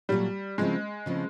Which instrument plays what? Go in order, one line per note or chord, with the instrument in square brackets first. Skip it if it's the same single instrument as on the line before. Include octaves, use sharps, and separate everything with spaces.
[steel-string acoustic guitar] A#2 F#3 A3 [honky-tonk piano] G3
[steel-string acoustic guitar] C#3 F3 A3 C4 E4 [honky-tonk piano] G#3
[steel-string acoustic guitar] C#3 F3 A3 C4 E4